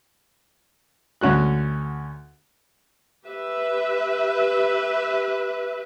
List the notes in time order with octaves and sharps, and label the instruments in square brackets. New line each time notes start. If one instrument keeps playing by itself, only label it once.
[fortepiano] D2 C#4 F#4 F#6
[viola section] G4 B4 E5